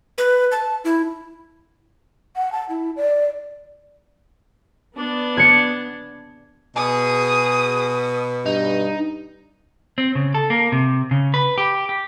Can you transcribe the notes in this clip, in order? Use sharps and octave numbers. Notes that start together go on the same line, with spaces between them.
B4
A5
E4
F#5
A5
E4
D5
B3 D4
G#6 C#7
B2 G#4 D#6
G2 D#4
C4
C#3
A4
A#3
C3
C#3
B4
G4
G4